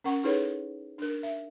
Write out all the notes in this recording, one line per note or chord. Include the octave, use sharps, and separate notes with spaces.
C#4 A#4 F#5 C#6
D#4 E4 G#4 A4 B4 C#5
D4 A#4
E5